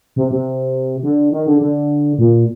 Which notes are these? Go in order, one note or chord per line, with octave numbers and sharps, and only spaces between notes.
C3
C3
D3
D#3
D3
D3
A#2